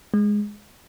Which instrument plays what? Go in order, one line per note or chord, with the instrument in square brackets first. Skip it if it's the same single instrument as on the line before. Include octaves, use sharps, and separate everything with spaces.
[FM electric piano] G#3